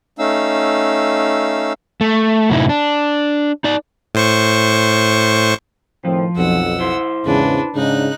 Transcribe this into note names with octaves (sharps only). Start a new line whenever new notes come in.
A3 C#4 D#4 F5 E6
A3
F#2 A2 C3 D#4 E4
D4
D#4 D5
A2 C5 C#6
A2 D#3 F3 C4
B1 F2 F#5 E6
E4 C5
E2 G#2 C#3 D4 B4
G#2 C#3 D4 D#4 F#6